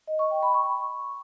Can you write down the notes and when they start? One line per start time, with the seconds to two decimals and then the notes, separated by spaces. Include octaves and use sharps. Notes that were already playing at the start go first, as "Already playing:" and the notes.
0.07 D#5
0.19 C#6
0.31 G5
0.43 B5
0.54 C#6